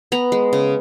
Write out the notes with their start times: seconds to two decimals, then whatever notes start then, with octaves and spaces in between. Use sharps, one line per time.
0.12 B3 A#5
0.32 G#3
0.53 C#3